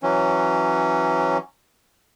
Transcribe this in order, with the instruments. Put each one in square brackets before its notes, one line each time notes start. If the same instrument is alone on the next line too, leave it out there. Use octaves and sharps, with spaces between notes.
[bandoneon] E3 F#3 C#4